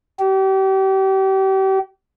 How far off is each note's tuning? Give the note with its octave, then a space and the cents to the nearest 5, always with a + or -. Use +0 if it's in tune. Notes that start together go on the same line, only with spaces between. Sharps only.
G4 -35